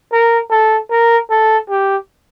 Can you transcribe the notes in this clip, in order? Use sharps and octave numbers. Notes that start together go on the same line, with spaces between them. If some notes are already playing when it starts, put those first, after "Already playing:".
A#4
A4
A#4
A4
G4